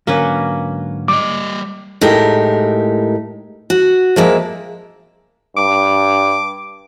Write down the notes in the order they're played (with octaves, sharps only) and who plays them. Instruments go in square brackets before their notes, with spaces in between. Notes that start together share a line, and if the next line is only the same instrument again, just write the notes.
[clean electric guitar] G#2 D3 F#3 [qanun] A#3 C#4 B4
[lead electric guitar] G3 D#5 [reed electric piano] D6
[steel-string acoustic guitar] A2 G#3 D#4 G4 A#4
F#4
F3 G#3 A#3 E5
[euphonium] G2 [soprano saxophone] D6